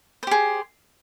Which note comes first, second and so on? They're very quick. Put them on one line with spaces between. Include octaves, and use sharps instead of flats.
C5 G4 G#4